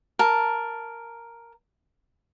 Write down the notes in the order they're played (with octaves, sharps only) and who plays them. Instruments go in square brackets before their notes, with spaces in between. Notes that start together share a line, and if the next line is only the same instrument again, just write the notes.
[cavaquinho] A#4 A5